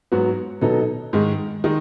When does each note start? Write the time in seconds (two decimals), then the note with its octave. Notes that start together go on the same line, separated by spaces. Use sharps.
0.12 G#2 F#3 B3 F#4
0.61 B2 F#3 B3 D#4 A4
1.13 G#2 D#3 G#3
1.64 D#3 G#3 D#4